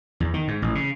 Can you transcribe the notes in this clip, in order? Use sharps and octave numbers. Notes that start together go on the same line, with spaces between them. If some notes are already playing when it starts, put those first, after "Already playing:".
E2
D#3
G#2
A1
C#3